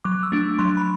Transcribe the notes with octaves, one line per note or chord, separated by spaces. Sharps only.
F#3 D6
E6
A3 D4
F#3 C6
B5